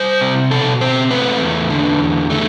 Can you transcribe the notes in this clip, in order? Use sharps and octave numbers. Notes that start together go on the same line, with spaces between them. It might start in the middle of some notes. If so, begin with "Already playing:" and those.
Already playing: G3 C5
C3
B2 A4
C4 C5
A3 B4
E2
D3
E2
A3